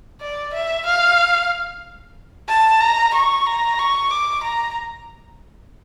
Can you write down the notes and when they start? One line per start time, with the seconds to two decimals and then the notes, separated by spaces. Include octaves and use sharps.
0.21 D5
0.53 E5
0.86 F5
2.49 A5
2.81 A#5
3.14 C#6
3.47 A#5
3.79 C#6
4.11 D6
4.44 A#5